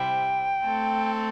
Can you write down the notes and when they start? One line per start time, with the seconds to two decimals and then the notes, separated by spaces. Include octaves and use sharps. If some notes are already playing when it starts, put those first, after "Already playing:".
Already playing: C3 G3 E4 C5 G5
0.63 A3 C4 A4